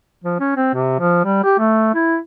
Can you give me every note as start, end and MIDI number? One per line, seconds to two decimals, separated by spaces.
0.24 0.37 53
0.40 0.53 61
0.56 0.69 60
0.74 0.98 48
1.00 1.22 53
1.25 1.43 55
1.44 1.58 67
1.59 1.90 57
1.94 2.17 64